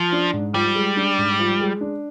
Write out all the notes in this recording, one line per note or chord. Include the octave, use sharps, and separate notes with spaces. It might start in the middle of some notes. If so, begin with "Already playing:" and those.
Already playing: F3
D4
G#2
F3 G3
G#3
D4
G#2
F3
G#3
D4